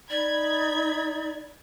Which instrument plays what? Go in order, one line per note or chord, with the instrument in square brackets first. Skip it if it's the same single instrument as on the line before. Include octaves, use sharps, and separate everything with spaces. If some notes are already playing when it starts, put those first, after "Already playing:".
[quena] D#4 [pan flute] D5 [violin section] B5 G#6